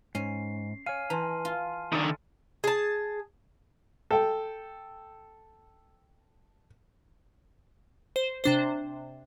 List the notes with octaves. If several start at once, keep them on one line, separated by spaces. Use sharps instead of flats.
G#2 C#4 C7
C#5 F5 G#5 F6 D#7
E3 A5 A#5 C6
F4
D3 D#3 E4 A4 D5
G#4 A5
A4 G5
C5
C3 D4 C5